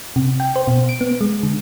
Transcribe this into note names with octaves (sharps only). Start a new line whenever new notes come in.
C3
G5
C5
B2
D7
B3
G#3
D3